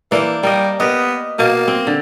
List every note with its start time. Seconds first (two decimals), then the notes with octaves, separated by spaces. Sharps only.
0.12 E3 A#3 D4 C5
0.43 G3 A#3 D#5
0.80 B3 G4 A#4 D#5
1.39 B2 A#3
1.68 C4
1.87 D3